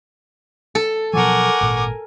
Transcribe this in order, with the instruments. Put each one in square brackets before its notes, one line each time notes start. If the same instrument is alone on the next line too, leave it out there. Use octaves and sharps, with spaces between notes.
[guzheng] A4
[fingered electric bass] B2 F3 F#3 [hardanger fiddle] A#4 G#5 [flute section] F#5 C#6 D6
[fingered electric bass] G#1 A#2